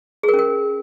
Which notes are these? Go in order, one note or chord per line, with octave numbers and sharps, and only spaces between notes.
G#4
A#4
C#4
A#4